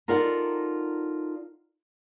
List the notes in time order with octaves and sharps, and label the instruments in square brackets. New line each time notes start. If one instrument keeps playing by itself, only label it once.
[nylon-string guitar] D#4 F4 A4 A#4 D5 F#5